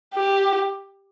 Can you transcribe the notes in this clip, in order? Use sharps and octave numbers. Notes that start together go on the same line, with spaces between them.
G4